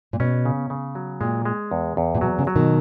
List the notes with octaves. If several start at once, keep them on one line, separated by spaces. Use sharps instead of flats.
A#2
B2 C#4
C#3
C#3
F#3
A#2 G#3
G#3
E2
E2
A#2
B2 F#3
C#3
F#3
B2 D#3